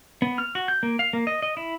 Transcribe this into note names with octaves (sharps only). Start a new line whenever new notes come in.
B3
F6
F#4
G6
A#3
F5
A#3
D#5
D#5
E4